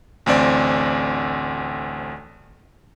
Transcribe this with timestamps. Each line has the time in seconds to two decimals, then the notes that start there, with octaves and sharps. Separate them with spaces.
0.26 A1 D2 C4 D5